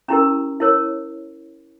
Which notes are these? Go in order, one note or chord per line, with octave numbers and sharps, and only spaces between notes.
C#4 E4 G4 A#4 A#5
E4 A#4 C#5